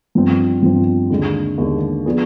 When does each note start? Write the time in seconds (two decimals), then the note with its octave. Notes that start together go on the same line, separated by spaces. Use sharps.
0.15 G2 F3 C4
0.62 G2 F3 C4
1.10 D#2 D3 G#3
1.58 D#2 D3 G#3
2.06 F3 B3 D4 G#4